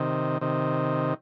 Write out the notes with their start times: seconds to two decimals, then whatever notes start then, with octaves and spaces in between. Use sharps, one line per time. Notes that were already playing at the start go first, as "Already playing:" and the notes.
Already playing: C3 D#3
0.41 C3 D#3